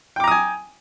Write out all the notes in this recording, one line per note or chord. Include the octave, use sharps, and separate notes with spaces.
G5 G#5 A#5 D6 D#6